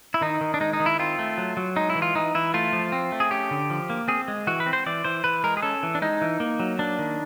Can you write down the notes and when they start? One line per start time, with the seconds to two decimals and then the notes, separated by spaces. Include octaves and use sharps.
0.14 E4
0.21 D#3 D#4
0.41 D#3
0.54 D4
0.60 G#3 D#4
0.73 D#4
0.80 D#3
0.86 E4
0.99 C4 F4
1.19 A3
1.38 F#3
1.57 F#3
1.76 G#3 D#4
1.90 E4
1.95 E3
2.02 F4
2.15 E3 D#4
2.35 E3 E4
2.54 A3 F4
2.73 F3
2.92 C4
3.12 A3
3.20 G#4
3.31 C#4 G4
3.51 D3
3.70 F3
3.90 A#3
4.08 C4 G#4
4.28 G#3
4.47 E3 F#4
4.60 B4
4.66 C4
4.73 C5
4.86 E3 D5
5.04 E3 C5
5.24 E3 B4
5.44 G#3 A#4
5.57 G#4
5.62 C#4 A4
5.83 E3
5.95 D4
6.02 G#3 D#4
6.21 E3
6.40 A#3
6.60 F#3
6.79 A#3 D4
6.99 D#3